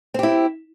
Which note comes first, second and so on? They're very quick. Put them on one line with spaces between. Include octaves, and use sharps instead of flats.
C4 G4 E4